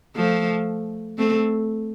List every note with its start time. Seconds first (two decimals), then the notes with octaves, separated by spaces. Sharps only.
0.16 F3 A3
1.18 A3 C4